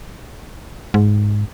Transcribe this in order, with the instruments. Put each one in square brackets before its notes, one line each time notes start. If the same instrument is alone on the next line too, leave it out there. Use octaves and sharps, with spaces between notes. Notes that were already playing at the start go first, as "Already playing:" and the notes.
[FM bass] G#2